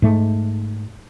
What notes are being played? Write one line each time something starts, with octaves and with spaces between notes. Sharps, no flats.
G#2 A3